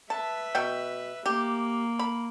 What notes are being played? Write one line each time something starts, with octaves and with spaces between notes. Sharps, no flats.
B4 E5 A5
B2 G5
A#3 G4
B5